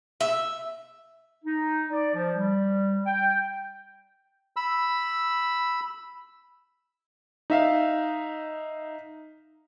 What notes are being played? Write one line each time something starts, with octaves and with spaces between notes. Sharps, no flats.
E5
D#4
D5
F3
G3
G5
B5 E6
D#4 E5 F5